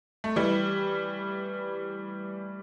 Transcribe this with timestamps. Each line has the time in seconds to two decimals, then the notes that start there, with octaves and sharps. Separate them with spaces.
0.24 A3
0.36 E3 G3